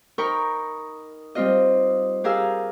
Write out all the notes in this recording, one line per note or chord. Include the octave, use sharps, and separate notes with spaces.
D#4 A#4 G5 B5 C#6
G3 C4 F4 D#5
G4 G#4 A#4 F5 E6